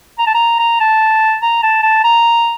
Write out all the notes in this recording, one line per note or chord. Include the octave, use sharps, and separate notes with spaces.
A#5
A5
A#5
A#5
A5
A#5
A5
A5
A#5